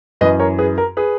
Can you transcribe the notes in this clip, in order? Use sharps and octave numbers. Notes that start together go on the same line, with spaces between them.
F#2 E3 B4 D#5
A#4 C#5
G#4 B4
A#4
G#4 B4